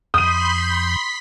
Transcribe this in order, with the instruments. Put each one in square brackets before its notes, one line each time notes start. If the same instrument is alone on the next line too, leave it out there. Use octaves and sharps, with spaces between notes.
[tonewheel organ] F2 G6 [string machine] B5 C6 B6 [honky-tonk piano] D#6 D#7